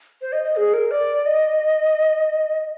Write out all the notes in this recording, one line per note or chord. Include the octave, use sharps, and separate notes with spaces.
C5
D#5
D#5
G#4
A#4
D5
D#5